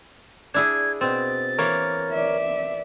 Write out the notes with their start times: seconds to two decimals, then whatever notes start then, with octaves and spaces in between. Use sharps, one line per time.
0.54 D4 E4 G#4 G#6
1.01 B2 C4 A6
1.58 E3 A#3 A#4 C#5
2.12 D5 E5